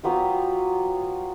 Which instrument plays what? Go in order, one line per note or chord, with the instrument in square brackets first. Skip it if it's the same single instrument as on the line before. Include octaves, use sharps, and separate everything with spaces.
[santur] F#3 B3 F4 G4